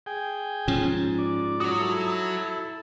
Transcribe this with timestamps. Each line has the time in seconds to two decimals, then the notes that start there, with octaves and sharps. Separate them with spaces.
0.06 G#4 G5
0.68 G#2 F3 C#4
1.18 D5
1.60 F#4 C#5 D#6
1.80 E4 A4